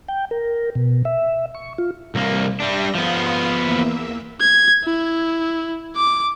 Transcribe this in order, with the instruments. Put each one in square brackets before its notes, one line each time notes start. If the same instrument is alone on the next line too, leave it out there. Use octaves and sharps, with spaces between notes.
[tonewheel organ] G5
A#4
B2
E5
C#6
F4
[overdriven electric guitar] C2 A#3
[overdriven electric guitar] G3 D4 [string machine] E5 A#6
[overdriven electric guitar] F3 B3 [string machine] F5 C6 D#6
[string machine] E2 A#3 E5
[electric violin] G#6
E4
D6